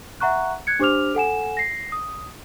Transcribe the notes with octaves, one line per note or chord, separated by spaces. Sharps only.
E5 F#5 A#5 C#6 F#6
F#6 G#6 C#7
D4 G4 C5 D6 F6 F7
A4 F#5 G#5 E7
A#6 C7
D#6